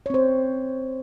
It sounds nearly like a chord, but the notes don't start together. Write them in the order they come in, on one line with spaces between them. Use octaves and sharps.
C#5 C4 C5